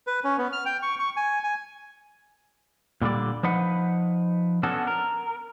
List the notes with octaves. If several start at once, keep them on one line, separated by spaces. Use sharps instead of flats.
B4
C#4
B3
F6
G5
C#6
C#6
G#5
G#5
A#2 D3 G3 D5
F3 D#4 B4 F#5
B3 C#4 D4 F#4 A4
A#4